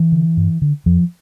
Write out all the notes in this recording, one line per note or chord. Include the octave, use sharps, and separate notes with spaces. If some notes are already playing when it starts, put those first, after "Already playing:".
Already playing: E3
D3
G2
D3
F2 F3